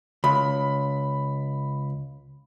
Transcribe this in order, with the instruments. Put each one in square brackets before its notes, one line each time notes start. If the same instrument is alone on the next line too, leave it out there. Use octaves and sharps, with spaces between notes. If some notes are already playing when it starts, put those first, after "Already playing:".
[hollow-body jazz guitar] C#2 [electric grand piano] B5